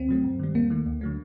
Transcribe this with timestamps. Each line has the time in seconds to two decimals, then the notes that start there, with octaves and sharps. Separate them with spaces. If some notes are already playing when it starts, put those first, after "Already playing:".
Already playing: D2 C4
0.09 C3 F#3 A3
0.24 G2
0.39 D#3 G3
0.55 D#2 A#3
0.70 D#3 A3
0.86 D2
1.01 D3 F#3 A3